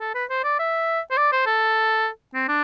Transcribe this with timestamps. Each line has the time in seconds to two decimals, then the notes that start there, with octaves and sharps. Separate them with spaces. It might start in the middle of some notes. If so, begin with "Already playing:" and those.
0.01 A4
0.15 B4
0.30 C5
0.44 D5
0.59 E5
1.11 C5
1.17 D5
1.32 C5
1.46 A4
2.34 C4
2.48 D4